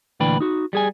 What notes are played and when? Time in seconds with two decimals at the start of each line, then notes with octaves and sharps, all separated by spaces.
0.20 D2 A#2 E3 D4 B4 G5
0.40 D#4 F#4
0.73 G3 G#4 G#5